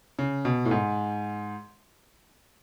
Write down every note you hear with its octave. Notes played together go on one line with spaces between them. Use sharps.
C#3
B2
A2
G#2